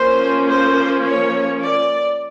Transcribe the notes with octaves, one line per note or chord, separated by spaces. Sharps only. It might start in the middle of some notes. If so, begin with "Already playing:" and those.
Already playing: F3 A#3 C#4 C5
C5
C#5
D5